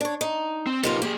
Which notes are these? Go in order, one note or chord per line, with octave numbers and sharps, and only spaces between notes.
D4 C#5
D#4
C4
C3 A#3 D#4 F4 B4 D#5
A#3 G4 G#4